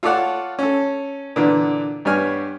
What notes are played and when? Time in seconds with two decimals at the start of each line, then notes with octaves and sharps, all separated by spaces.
0.03 F4 A4 C#5 D5 F#5 A5
0.59 C#4 A4
1.36 A#2 D3 E3 B3 D4
2.05 G2 G3 B3 C#5 G#5 F6